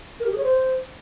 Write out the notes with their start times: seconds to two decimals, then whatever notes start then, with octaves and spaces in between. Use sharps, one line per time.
0.20 A#4
0.26 G4
0.32 G#4
0.38 C#5
0.44 C5